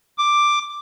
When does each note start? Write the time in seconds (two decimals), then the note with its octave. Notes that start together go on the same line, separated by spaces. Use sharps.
0.18 D6